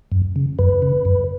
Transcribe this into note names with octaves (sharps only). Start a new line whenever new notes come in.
F#2
C#3
F#2 B4
C#3
F#2